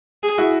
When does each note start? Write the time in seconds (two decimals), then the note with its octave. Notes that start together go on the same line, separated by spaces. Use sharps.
0.23 G#4
0.38 E4 F#4